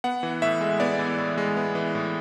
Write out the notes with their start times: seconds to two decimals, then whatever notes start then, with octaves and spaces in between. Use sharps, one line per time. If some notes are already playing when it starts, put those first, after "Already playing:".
0.04 B3 F#5
0.23 E3
0.42 A2 E5
0.61 G#3
0.80 B3 D5
0.99 E3
1.18 A2
1.38 G#3
1.56 B3
1.75 E3
1.95 A2